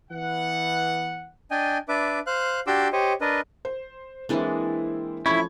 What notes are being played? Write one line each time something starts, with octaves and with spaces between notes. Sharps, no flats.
E3 B3 F#5
D4 D#5 G5 G#5
D4 B4 E5 D6
C5 F5 F#6
D4 F#4 G4 C6 D6 E6
G4 C5 C#5 D#5
D4 A#4 B4 D#5
C5
E3 G#3 A#3 C4 D4 E4
F3 A3 C#4 E4 B5 C#6 G#6